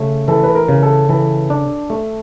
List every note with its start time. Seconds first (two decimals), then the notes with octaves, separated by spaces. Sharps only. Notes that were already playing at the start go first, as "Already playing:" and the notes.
Already playing: C#3 A3
0.28 E3 A4
0.43 B4
0.55 A#4
0.68 C#3
0.82 A4
1.09 E3 A4
1.50 D4
1.90 A3